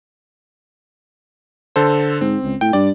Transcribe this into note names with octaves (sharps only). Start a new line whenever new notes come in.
D3 A4 C5
G#2 C4
C#2
A2 G5
G2 D5